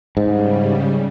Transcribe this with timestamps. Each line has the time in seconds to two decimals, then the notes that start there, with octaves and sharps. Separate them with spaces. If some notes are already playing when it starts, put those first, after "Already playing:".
0.17 G#2 C#3 G3